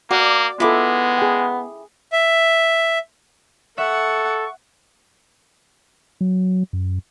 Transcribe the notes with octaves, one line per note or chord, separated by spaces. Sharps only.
A#3 F#4 D5 F#5 D6
G#3 B3 E4 F4 A4 D6
G#4 G5
E5
A4 E5 F#5 C#6
F#3
F#2